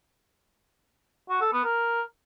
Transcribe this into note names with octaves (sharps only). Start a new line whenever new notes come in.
F#4
A4
B3
A#4